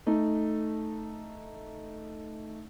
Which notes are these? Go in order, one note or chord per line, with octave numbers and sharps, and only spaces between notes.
A3 D#4